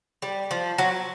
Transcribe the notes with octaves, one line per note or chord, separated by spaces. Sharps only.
G3
F3
F#3